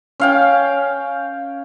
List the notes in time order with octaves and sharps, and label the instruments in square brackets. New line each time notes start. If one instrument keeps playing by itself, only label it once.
[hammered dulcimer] C#4 F5 G5